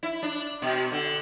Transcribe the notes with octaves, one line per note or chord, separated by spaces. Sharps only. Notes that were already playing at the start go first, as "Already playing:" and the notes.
E4
D4
B2
D3